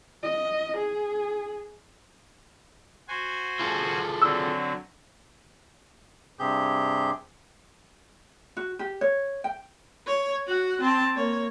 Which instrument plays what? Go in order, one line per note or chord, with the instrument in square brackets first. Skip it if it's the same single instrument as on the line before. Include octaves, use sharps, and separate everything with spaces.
[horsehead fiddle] D#5
G#4
[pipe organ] F#4 C5 G#5
[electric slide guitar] F4 G#4 A4
[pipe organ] D3 F#3 C4 [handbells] E6
[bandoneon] G2 C3 C4 G4 G#4 G6
[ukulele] F#4
G4
C#5
G5
[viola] C#5
F#4 F#5
C4 A5
A#3 C#5